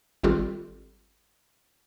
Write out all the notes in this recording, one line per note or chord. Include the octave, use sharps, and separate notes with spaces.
G#1 G3 C4 F4 G4 A4